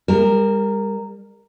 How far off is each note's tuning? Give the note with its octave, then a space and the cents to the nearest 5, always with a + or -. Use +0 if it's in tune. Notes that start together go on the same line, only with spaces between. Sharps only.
G3 +40 A#4 -10